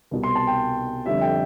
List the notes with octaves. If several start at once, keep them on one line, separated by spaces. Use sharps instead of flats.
C2 B2 G3
C6
A5
G5
F2 D3 G3 E5
G5